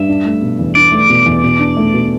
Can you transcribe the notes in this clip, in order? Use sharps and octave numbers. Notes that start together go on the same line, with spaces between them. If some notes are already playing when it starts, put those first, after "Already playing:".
Already playing: G2 E5
D4
A3
B2
E2
D4 D5
A3
B2
E2
B2
D4
A3
B2